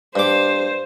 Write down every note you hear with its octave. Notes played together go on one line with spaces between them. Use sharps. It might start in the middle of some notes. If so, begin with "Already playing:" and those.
G2 C5 D6